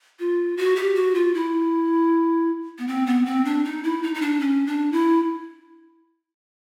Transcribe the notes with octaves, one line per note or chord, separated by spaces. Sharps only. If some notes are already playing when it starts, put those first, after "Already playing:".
F4
F#4
G4
F#4
F4
E4
B3
C4
B3
C4
D4
D#4
E4
D#4
D#4
D4
C#4
D4
E4